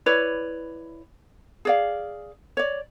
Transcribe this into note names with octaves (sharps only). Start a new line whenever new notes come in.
E4 B4 C#5 D5
G#4 D5 F5
C#5 D5